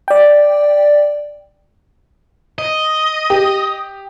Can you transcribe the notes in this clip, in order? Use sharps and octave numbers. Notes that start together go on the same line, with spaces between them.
D5 G5
D#5
G4